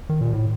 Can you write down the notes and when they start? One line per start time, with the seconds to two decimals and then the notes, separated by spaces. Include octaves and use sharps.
0.09 D#3
0.21 A#2
0.33 A2